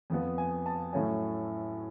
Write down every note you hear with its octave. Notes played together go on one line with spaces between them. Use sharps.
F2 F3 B3
G#5
A5
A2 F#3 A3 C#4 G#5